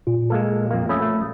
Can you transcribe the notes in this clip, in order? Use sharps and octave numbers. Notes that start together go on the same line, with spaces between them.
A#2 F4
G#3 A#3 A4
F2 A#3
A3 C#4 B5 D#6 E6
A3